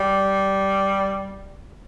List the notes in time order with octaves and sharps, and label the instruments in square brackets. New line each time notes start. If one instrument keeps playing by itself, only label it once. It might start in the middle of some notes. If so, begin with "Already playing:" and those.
Already playing: [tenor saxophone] G3